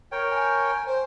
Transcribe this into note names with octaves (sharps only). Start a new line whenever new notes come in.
A#4 C#5 G5
G#5
C5